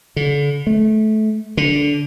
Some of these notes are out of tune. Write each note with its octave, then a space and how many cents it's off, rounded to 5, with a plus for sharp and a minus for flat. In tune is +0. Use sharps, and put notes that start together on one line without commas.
D3 -40
A3 -25
D3 -15